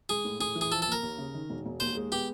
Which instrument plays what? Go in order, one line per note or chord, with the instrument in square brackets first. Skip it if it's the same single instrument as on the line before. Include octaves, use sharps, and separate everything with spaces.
[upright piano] G#3 [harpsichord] G#4
[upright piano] A2
[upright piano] A2 [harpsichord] G#4
[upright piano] E3
[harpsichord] G#4
[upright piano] F3 [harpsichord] A4
[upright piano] A#3 [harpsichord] A4
[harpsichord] A#4
[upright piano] D#2
C#3
D#3
E1
E1
[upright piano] D#2 [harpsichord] C5
[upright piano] G#3
[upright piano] B3 [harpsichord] G4